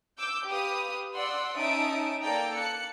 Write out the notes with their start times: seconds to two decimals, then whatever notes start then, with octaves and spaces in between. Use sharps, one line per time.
0.19 D6 E6 G6
0.48 G4 B4 F5 D#6
1.15 D5 F#5 C6 E6
1.56 C#4 D#4 E5 A5 D#6 D7
2.23 A#3 A4 D5 G5 A#5
2.56 A5 F#6 C#7